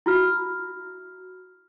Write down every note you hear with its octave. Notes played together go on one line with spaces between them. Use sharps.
E4 F#4 F6